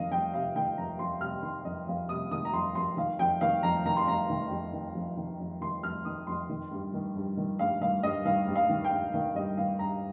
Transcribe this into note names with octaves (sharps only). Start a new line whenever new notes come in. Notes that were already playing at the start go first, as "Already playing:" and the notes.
Already playing: F2 D#3 D#5 F5
F2 G5
C3 F5
D#3 G5
F2 A#5
F2 C6
C3 F6
D#3 C6
F2 D#5
F2 F5
C3 D#6
D#3 D#6
A#5
F2 C6
F2 C6
D#3 F5
F2 G5
D#3 F5
F2 A#5
D#3 A#5
C6
F2 A#5
D#3
F2
D#3
F2
D#3
F2
D#3 C6
F2 F6
D#3 D#6
F2 C6
D#3
G2
D#3
G2
D#3
G2 F5
D#3 F5
G2 D#5
D#3 F5
G2
F5
D#3
G5
G2
D#3 F5
G2 D#5
D#3 F5
G2 A#5